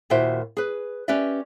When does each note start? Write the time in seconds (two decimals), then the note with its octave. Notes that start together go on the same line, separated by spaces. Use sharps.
0.10 D#2 A#2 E4 F#4 C5 E5
0.57 G#4 B4
1.08 C#4 G4 B4 D5 E5